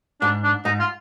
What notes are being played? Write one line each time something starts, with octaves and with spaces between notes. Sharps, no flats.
G#2 D4
D4
G#2 D#4
F4